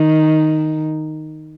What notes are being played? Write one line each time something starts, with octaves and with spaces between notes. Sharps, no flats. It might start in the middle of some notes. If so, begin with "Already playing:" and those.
Already playing: D#3